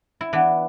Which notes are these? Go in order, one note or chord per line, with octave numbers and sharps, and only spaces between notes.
E4
E3 B3 D4